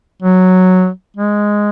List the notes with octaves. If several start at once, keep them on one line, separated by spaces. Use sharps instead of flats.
F#3
G#3